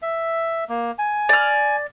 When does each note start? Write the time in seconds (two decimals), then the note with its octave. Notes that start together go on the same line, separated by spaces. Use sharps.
0.02 E5
0.69 A#3
0.99 G#5
1.29 D5 F6